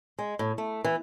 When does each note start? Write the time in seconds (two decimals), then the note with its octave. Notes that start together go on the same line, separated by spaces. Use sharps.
0.18 G#3
0.39 A2
0.58 A3
0.84 E3